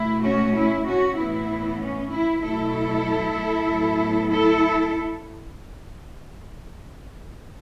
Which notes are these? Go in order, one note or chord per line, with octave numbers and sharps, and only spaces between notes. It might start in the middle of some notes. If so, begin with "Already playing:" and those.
Already playing: B2 A3 E4
C#4 F#4
E4
C#4 F#4
A2 E3 B3 E4
C#4
E4
B2 F#3 A3 E4 A4
A2 F#3 B3
E4 A4